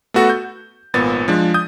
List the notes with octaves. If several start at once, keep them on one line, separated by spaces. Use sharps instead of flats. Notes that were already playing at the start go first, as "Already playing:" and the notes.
A3 B3 F#4 A4
G6
G#1 A#2 B3 A6
F3 G#3 D4
D#6 G6